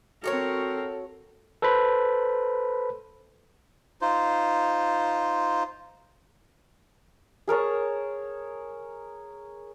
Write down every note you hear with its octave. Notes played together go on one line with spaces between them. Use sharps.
C4 F#4 G4 A4 A#4 C#5
A4 B4 C5 B5
D#4 F4 C5
G#4 A#4 C#5 A5